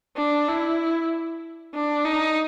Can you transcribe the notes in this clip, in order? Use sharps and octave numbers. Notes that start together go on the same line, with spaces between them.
D4
E4
D4
D#4